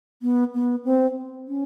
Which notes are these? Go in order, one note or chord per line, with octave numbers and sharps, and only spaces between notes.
B3
B3
C4
C#4